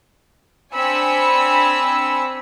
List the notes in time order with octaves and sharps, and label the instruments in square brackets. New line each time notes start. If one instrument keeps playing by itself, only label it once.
[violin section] C4 D4 G#5 B5 E6 C#7